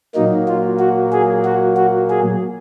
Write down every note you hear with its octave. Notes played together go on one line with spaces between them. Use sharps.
A#2 F#3 A#3 D#4
F4
F#4
G#4
F#4
F#4
G#4